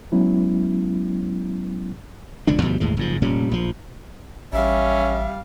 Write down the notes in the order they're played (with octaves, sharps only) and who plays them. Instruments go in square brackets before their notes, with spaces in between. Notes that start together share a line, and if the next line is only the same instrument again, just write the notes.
[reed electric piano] F#3 G#3 B3 C#4 E4
[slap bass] E1 C#2 D3 D4
D2 B2 F3 G3
G1 D#2 A2 G#3
F#1 G#2 F3
F1 A#2 G3 C#4
A#1 F3
[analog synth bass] A1 [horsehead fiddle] G3 F5 [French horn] C#4 [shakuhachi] E5